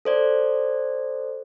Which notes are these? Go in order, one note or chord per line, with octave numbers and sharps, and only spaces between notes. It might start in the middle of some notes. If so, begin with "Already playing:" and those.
A4 C5 D5